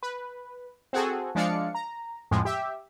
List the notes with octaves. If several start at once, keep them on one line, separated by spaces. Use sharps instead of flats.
B4
C4 F#4 G#4 A4
F3 G#3 D4 D5 F5 C#7
A#5
F2 A2 F3 G#3
G4 E5